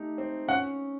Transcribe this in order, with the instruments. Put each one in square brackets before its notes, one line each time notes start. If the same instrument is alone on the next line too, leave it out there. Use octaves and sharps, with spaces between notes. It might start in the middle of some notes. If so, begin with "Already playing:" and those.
Already playing: [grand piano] A3 D#4 G4
C4
[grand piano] C#4 [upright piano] F#5